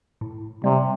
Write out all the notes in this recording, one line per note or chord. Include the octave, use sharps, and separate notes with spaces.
A2
C3 G3